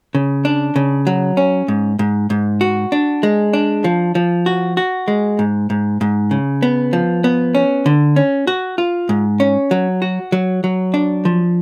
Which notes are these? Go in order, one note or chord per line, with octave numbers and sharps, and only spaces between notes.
C#3
D4
C#3
F#3
C#4
G#2
G#2
G#2
F#4
D4
G#3
D4
F3
F3
F#4
F#4
G#3
G#2
G#2
G#2
C#3
B3
F3
B3
C#4
D3
C#4
F#4
F4
G#2
C#4
F#3
F#4
F#3
F#3
D4
F3